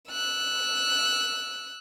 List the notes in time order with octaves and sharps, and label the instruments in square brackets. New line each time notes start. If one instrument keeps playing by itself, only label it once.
[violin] E6 F#6